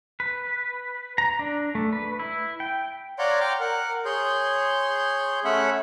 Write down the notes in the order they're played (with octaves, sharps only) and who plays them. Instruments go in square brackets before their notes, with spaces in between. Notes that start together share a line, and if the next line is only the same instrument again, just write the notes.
[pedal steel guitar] B4
A#5
D4
A3
B4
E4
G5
[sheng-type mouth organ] C#5 D5 F5 F#5 A#5 C6
G5 A#5 D6 F6
A#4 F#5
G#4 C#5 C6 G6
A3 C#4 C#5 E5 F#5 B5